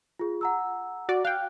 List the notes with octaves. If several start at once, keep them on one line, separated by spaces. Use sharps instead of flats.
F4 G#4
F#5 A#5 E6
F#4 D5
F5 G5 F#6